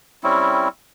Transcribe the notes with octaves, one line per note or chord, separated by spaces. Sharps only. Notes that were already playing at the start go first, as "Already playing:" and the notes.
G3 C4 C#4 E4